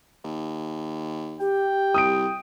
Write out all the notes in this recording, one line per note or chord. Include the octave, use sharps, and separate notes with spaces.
D#2
G4 G5
C2 D#6 D7